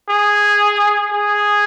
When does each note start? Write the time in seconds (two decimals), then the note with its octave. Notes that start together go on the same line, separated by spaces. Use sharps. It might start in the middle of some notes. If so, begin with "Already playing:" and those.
0.10 G#4
1.12 G#4